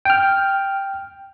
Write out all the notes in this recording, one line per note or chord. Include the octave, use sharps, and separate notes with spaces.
G5 F6